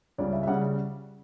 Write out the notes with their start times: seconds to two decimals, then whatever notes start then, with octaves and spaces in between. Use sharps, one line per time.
0.18 C#2 C#3 G3 D5
0.32 E5
0.43 E5
0.47 C#3 G3 F#5